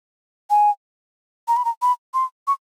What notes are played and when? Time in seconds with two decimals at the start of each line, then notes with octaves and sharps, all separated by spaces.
0.50 G#5
1.48 A#5
1.56 B5
1.65 A#5
1.82 B5
2.14 C6
2.47 C#6